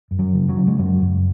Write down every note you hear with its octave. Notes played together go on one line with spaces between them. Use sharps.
F#2
F#3
C#3
F#3
C#3
G#3
F#2 F#3
F#2